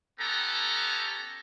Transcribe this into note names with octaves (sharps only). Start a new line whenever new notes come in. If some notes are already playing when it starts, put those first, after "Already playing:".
B3 C#4 G4 A4 A#5